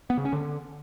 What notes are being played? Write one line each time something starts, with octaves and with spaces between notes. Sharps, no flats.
B3
C#3
C#4
D3